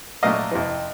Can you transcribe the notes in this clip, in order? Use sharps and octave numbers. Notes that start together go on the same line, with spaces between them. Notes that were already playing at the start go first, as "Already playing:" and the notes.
A#2 F#3 A3 D#5 F5
F2 C3 E3